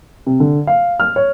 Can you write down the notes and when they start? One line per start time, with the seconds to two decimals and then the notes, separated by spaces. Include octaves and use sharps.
0.27 C3
0.40 D3
0.67 F5
1.00 F6
1.16 C#5